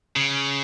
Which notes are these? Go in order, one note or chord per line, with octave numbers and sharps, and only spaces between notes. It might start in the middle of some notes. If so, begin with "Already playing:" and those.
C#3